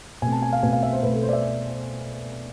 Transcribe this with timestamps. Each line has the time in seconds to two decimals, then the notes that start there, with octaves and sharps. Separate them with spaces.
0.22 B2 A3 C4 G#5
0.32 A5
0.42 G#5
0.53 F5
0.63 B2 A3 C4 G#5
0.73 F5
0.83 E5
0.93 C5
1.03 B2 A3 C4 B4
1.13 A4
1.23 C5
1.29 D5
1.33 E5